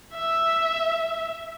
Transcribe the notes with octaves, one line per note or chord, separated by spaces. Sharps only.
E5